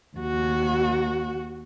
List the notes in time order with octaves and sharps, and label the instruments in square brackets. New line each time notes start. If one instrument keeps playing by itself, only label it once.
[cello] D#2 F#4